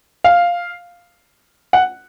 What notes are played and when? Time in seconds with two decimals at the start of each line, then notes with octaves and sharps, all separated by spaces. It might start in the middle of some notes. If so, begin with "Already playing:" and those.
0.24 F5
1.73 F#5